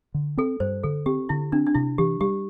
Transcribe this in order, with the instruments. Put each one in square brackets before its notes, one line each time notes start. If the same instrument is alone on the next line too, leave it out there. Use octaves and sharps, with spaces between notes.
[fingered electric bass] D3
[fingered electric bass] C4 [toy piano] A4
[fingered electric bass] G2 [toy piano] C5
[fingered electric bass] D3 [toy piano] A4
[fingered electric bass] C4 [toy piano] G4
[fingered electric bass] D3 [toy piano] E4
[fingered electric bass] C4 [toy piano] D4
[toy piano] D4
[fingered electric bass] C3 [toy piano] E4
[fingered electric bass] E3 [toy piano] G4
[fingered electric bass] G3 [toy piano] G4